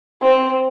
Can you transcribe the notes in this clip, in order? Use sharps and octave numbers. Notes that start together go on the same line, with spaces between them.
C4